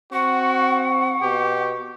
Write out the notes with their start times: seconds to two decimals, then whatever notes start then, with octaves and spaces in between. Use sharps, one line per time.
0.13 C4 F#4 F#5 C#6
1.22 B2 G4